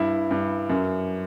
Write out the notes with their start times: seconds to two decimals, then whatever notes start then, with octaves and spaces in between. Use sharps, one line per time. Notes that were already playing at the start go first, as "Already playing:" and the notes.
Already playing: G2 E4
0.31 G2
0.70 F#2